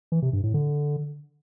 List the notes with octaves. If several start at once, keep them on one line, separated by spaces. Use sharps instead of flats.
E3
C3
G2
A2
D3